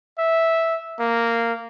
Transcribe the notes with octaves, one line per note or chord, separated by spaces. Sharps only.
E5
A#3